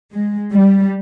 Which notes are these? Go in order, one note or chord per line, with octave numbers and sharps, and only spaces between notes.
G#3
G3